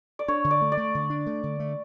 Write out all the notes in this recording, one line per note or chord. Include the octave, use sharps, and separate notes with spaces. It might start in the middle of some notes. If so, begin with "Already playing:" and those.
D5
D4 C#5
D3
D5
A3
D5
A3
D3
D4
A3
D3
A3